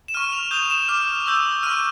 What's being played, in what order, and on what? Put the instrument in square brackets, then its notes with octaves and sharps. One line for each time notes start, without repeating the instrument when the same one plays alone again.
[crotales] E7
C#6 F6 D#7
F7
D#6 G6 F7
E7
D6 F6 E7
C#6 E6 G6
C#6 F6 D#7